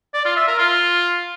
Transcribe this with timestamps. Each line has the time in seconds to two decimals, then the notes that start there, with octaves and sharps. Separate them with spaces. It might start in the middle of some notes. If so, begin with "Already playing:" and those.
0.14 D5
0.25 F4
0.36 E5
0.48 A#4
0.59 F4